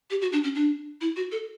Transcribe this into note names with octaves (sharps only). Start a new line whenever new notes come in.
G4
F#4
D4
C#4
D4
E4
F#4
A4